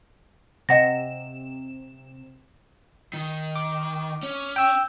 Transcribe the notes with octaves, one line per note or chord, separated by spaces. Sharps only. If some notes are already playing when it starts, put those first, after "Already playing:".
C3 D#5 F#5 A#6 E7
D#3
D6
C#4
G5 E6